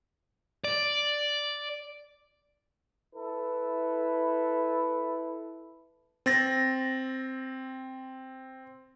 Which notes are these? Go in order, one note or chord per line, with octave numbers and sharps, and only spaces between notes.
D5
E4 A4 B4
C4 A6 A#6